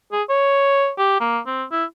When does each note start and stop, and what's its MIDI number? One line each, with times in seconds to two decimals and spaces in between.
0.12 0.23 68
0.29 0.90 73
0.98 1.19 67
1.20 1.39 58
1.46 1.64 60
1.71 1.84 64